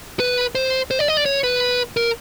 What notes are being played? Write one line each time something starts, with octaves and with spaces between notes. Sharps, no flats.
B4
C5
C5
D5
D#5
D5
C#5
B4
A#4